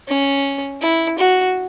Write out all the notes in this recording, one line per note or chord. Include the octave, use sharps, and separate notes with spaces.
C#4
E4
F#4